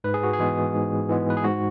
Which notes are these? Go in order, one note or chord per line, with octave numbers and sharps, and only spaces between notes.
G#2 B4
G#4
F#4
G#4
E3 G#3 B3
G#2
E3 G#3 B3
B4
G#4
G#2 F#4